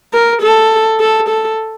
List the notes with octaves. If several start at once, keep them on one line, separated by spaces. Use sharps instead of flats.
A#4
A4
A4
A4